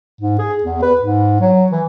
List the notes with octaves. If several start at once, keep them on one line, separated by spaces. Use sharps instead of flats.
G#2
G#4
E2
B4
G#2
F#3
E3